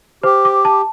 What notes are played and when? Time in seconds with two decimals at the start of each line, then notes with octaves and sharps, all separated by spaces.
0.23 G4 C5
0.45 D6
0.65 A5